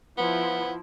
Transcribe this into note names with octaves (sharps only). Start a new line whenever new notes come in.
F3 B3 E4